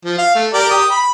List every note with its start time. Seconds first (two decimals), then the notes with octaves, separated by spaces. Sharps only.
0.05 F3
0.18 F5
0.35 A3
0.54 G4 A#4 D5
0.71 G4 D#6
0.91 B5